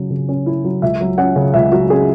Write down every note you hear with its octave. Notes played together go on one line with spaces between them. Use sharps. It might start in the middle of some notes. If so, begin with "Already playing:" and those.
Already playing: C#3 F#3 C#4
C#3
C#4
E4
F#3
C#2 E5
F#3
C#4 F#5
C#3
C#2 E5
F#3 F#4
C#4 G#4